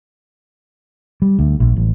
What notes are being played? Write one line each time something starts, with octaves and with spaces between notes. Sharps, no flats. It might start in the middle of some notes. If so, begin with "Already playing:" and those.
G3
D2
A#1
A1